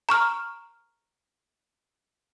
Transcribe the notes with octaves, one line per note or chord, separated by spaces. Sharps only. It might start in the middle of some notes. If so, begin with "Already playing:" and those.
A#5 C#6 F6